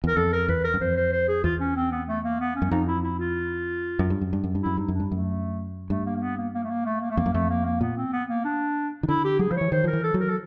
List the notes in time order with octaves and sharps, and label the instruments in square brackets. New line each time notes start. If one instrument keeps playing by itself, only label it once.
[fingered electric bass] E2 [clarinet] A#4
[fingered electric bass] F2 [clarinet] A4
[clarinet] A#4
[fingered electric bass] E2 [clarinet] B4
[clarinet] A#4
[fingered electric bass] F#2
[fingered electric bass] F2 [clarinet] C5
[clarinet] C5
C5
G#4
[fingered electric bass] E2 [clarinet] F4
[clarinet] C#4
C4
B3
A3
A#3
B3
C#4
[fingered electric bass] F#2
[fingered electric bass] F2 [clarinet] D#4
[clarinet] E4
E4
F4
[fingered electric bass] F#2
G2
F#2
G2
F#2
G2
[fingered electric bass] F#2 [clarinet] E4
[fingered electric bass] G2 [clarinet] D#4
[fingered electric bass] F#2
[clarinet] D4
[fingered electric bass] G2
[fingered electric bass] F#2 [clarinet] A3
[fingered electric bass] G2 [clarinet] A3
[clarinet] A#3
A#3
B3
A#3
A#3
A3
A#3
A3
A#3
A3
[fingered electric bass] F2 [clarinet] A#3
[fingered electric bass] F#2
[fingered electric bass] F2 [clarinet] A3
[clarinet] A#3
A#3
[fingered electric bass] A#2 [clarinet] B3
[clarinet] C4
B3
A#3
D4
[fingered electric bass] D#3
[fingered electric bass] D3 [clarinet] E4
[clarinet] G4
[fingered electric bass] F#3 [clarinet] G#4
[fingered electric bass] F3 [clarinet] C5
[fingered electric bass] E3 [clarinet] C#5
[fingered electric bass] D#3 [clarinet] C5
[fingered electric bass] F3 [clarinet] A#4
[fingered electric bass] E3
[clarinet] A4
[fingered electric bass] F#3
[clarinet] A#4
A4